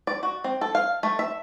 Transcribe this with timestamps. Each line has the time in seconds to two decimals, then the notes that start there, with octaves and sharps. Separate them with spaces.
0.07 D5
0.23 F#4
0.44 C4
0.61 A4
0.75 F5
1.03 A3
1.19 E5